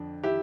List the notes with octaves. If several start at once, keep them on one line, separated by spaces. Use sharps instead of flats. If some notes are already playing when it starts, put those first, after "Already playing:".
Already playing: F2 D3 D4
E4 G4